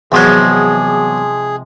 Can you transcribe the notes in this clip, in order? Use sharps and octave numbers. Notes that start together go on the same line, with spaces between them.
E2 C3 F3 F#3 G#3 G#4 C5